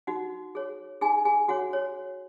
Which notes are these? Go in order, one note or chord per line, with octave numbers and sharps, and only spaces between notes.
D#4 F#4 F#5
G#4 C#5
D#4 G#4 G#5
G#4 G#5
F#4 G#4 C#5 F#5
C#5